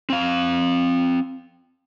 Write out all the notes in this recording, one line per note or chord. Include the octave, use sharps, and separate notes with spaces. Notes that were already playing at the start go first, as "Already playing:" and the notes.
C4 F5